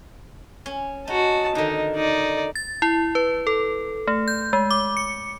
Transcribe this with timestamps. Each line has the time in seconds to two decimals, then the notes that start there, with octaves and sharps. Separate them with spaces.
0.66 C#4
1.07 D#4 F#4 A5
1.55 D3 D#3 D#4
1.96 D#4 D5
2.55 A6
2.82 E4
3.15 B4
3.47 A4
4.07 A3
4.28 G6
4.53 G#3
4.71 D6
4.97 C#7